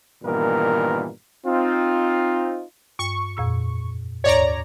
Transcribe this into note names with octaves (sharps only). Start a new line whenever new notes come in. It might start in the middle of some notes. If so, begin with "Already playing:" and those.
G2 A#2 D#3 E3 B3 A#4
C4 D#4 F4
G2 C#6
F2 A#2 E6
D#2 G#2 C#5 D5 A#5